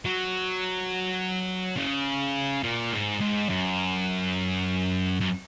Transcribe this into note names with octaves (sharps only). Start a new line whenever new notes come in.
F#3
C#3
A#2
G#2
G#2
F#2
F#2